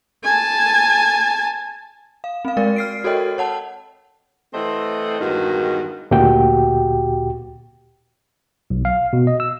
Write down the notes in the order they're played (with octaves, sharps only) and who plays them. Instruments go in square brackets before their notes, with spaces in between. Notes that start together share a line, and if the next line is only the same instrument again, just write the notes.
[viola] G#5 A5
[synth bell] F5
C4 F5
G#3 A#4 D5
F6 C7 D7
F#4 A4 A#4 C#5 D#5 G5
C#5 F#5 A5
[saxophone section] E3 A3 C4 C5 D#5 F#5
E2 G2 D#3 G#3 F#4
[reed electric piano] D2 A#2 F#4 G4 G5
[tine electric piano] B1
F5
B2
D#5
E6